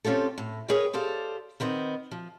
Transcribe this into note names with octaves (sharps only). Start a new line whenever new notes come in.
C4 C#4 F4 G4 A4
A2
G#4 A#4 B4 C#5 D#5 G5
G4 A4 C5 D5 F5
D#3 B3 C4 D#4
F3